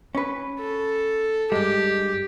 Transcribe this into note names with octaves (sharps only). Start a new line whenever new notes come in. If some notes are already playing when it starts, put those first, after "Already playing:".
C#4 B4
A4
G2 G#3 G4